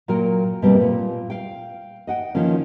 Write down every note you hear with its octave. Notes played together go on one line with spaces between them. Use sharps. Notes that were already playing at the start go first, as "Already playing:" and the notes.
A#2 F#3 A#4 G5
B2 G3 A#3 C4
A#2
F5 G5
D#5 F#5 G5
D#3 F3 A#3 C#4